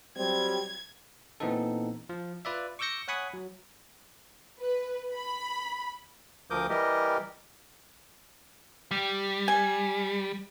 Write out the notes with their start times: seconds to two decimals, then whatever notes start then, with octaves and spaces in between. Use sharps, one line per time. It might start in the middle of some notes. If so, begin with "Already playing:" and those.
0.17 F#3 G3 C4 G#6
1.40 A#2 E3 B3 C4 D#4 A4
2.09 F3
2.45 F4 B4 D5 E5
2.79 C#6 D6 E6 G6 A#6 C#7
3.08 C#5 F#5 G#5 B5 C#6 D#6
3.34 F#3
4.59 B4
5.12 B5
6.50 D2 F3 A#4 D6 D#6 G6
6.69 E3 G3 G4 A#4 D#5
8.91 G3
9.48 G#5